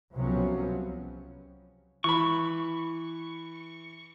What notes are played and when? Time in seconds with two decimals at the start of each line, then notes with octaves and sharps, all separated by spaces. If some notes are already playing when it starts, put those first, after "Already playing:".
0.16 C2 C3 F3 F#3 B3 C#4
2.04 E3 B5 C#6